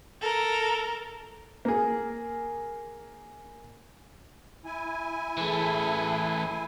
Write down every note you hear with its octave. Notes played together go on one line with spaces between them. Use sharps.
A4 A#4
A#3 G#4
E4 G#5
E3 A3 G#4 E5 A5